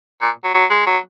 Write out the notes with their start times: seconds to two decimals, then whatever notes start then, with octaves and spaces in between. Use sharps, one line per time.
0.22 A#2
0.44 F#3
0.54 F#3
0.70 G#3
0.86 F#3